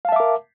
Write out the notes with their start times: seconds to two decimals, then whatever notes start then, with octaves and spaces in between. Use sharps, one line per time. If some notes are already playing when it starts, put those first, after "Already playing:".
0.05 F5
0.09 A5
0.12 E5
0.16 D6
0.20 A#4